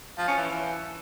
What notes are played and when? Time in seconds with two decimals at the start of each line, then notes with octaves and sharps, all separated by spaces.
0.18 F3
0.28 C#4
0.37 E3